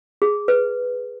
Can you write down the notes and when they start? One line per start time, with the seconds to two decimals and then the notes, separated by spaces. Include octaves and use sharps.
0.22 G#4
0.48 B4